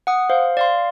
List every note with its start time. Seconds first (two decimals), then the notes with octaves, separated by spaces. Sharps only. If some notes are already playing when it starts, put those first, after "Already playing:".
0.07 F#5 D#6
0.30 C5 F5
0.57 D5 F5 C6